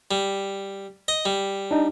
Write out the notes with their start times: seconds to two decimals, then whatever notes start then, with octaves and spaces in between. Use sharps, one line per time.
0.11 G3
1.08 D#5
1.25 G3
1.71 D4 D#4